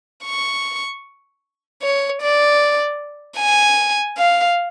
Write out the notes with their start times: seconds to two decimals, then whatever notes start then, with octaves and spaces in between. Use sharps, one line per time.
0.25 C#6
1.82 C#5
2.22 D5
3.38 G#5
4.18 F5